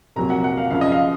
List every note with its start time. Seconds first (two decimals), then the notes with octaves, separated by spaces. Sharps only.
0.16 C2 A#2 F#3 A#5
0.30 F#5
0.44 F#5
0.57 F5
0.71 F#2 C#3 F3 F5
0.81 D#5
0.92 F5